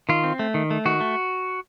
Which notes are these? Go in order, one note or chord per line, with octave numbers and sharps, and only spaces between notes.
D#3 F4
C4
A3
D#3
A3
D#3 F#4
A3